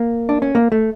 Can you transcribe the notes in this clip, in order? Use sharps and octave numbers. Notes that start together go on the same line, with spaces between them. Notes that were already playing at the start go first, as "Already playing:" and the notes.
Already playing: A#3
D4
C#4
A#3
A3